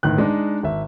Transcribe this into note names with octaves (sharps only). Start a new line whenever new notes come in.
G1 A2 D#3 F#6
G#3 D4 D#4
G#1 E5